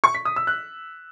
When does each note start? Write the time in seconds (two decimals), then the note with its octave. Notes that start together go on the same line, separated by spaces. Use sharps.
0.04 C#6
0.15 B6
0.25 D#6
0.36 E6
0.47 F#6